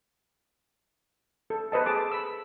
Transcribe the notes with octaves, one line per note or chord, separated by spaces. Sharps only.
A4
A4 B4 C5 D#5 A5
G#4 A5 D6
B5 E6